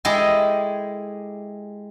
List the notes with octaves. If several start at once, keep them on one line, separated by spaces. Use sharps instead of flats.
G#3 E4 G4 A4 D#5 G#5